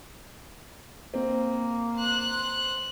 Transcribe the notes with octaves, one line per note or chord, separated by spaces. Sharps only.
A#3 C4
C5 F#6